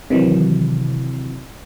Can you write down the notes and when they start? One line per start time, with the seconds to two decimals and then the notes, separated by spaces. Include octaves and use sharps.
0.10 C3 D#3 E3 F#3